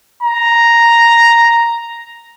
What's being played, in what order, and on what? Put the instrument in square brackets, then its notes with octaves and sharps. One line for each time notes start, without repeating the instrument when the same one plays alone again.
[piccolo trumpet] A#5